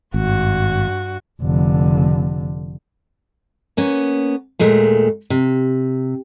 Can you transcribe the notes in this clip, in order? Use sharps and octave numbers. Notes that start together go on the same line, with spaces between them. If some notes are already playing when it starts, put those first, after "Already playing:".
G#1 G2 F#4
F1 D3
A#3 B3 C#4
D#2 A#2 G#3 A3
C3